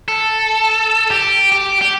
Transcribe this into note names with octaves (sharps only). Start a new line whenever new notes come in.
A4
G4
G4
G4